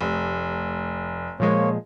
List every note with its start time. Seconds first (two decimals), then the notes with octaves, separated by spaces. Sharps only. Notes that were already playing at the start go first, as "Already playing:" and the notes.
0.01 F1
1.40 A#2 F3 G#3 A#3 C#5